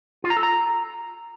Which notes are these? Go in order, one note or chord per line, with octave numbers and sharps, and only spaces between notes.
F4
A#5
A4
A#5